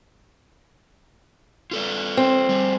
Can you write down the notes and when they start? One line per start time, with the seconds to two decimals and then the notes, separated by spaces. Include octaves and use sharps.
1.71 F4 A4 D5
2.17 C4
2.49 G3 A3